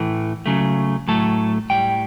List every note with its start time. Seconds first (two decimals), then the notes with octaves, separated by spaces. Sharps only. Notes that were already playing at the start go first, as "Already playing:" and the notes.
Already playing: A2 E3 A3
0.46 C#3 F#3 A3
1.08 A2 F#3 A3 A4
1.70 A2 G3 G5